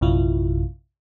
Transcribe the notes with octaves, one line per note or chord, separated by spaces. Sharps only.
A#1 F#2 C3 E4 F4